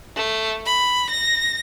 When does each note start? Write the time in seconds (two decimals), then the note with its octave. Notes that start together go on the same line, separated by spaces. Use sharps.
0.16 A3
0.66 B5
1.10 A#6